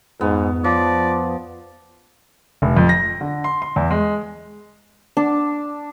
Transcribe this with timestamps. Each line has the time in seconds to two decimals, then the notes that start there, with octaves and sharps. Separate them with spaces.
0.21 F2 G#2 B3
0.64 F3 F4 D5
2.62 F1
2.77 F2
2.89 A#6
3.21 D3
3.44 C6
3.62 C6
3.76 E2
3.91 G#3
5.17 D4